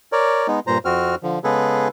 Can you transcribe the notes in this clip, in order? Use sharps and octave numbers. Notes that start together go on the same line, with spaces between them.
A#4 C#5 D5
G#3 B3 D#4
G2 A#2 C5 A#5
F2 C4 F#4 F6
D3 F3
C#3 G#3 B3 G#4 A4 B4